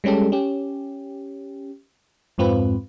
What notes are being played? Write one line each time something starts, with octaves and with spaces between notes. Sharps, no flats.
G3 G#3 C#4 G4 A4
C#4 G4
F2 G#2 C4 F4 B4